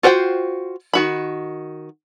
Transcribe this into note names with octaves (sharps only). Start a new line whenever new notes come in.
F4 F#4 C5 F#5 G5
D#3 F#4 B5